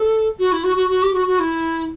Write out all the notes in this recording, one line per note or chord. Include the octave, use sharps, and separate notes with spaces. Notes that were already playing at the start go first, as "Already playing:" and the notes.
Already playing: A4
F#4
E4
F#4
F#4
F#4
G4
F#4
F#4
E4